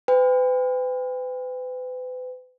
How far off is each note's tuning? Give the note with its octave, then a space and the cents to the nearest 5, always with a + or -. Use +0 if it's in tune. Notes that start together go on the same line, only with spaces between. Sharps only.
B4 +40 G5 +35